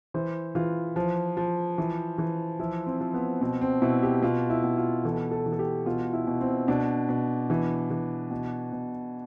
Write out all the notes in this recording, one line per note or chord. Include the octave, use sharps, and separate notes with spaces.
E3 C5
E3 F4
F3
F3
E3
E3
F3 E4
C4
F3
B3
B2 C4
C4
B2 E4
G4
B2 F4
E4
B2
F4
E3 A4
A4
E3
A4
G4
B2 F4
E4
B2
C4
B2 D4
B2
E3
E3
B2
B2